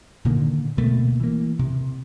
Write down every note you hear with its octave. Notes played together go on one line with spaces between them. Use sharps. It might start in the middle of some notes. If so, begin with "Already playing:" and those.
A#2 D3 D#3 A#3
D2 B2 A3 A#3
E3 A#3
C3